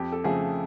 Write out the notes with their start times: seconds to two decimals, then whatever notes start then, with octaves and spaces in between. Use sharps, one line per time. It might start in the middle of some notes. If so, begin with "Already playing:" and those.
Already playing: F2 G4
0.12 A4
0.24 C#3 F3 A3 G#4